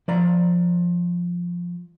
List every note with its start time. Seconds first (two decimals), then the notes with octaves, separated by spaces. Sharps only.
0.08 F3 D5 A#5